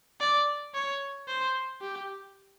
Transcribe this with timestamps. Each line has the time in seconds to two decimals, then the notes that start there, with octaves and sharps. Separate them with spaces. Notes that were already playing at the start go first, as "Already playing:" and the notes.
0.21 D5
0.74 C#5
1.28 C5
1.81 G4